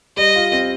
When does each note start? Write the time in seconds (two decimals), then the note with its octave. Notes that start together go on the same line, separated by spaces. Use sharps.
0.17 G3 D#5
0.35 F4
0.52 C4